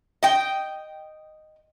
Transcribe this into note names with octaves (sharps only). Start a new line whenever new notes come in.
D#5 G5